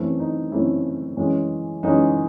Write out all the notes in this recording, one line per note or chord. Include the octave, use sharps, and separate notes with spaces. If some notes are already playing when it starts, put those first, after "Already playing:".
Already playing: F#2 E3 A3 C4
D#4
F#2 E3 A3 C4 E4
F#2 E3 G#3 C#4
F#2 E3 G#3 C#4 D#4